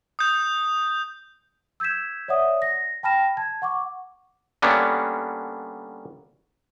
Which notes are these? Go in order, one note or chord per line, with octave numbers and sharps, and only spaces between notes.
D#6 G6
E6 G6 G#6 B6 E7
C#5 D5 E5 F#5 D#6
A#6
G5 A5 B5 F6 A#6 E7
A5 G#6
F#5 C#6 D6
D3 G3 A#3 B3 C#4 D4